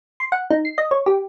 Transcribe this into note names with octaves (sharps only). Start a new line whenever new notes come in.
C6
F#5
D#4
C7
D#5
C#5
G4